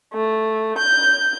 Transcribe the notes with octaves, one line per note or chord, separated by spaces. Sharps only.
A3
G6